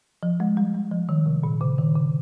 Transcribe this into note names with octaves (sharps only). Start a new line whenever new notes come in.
F3
G#3
G3
G3
F3
D#3
C3
A#2
C#3
D#3
C#3